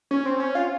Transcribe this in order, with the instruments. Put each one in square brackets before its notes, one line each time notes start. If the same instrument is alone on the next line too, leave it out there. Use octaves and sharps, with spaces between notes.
[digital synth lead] C#4
C4
C#4
F4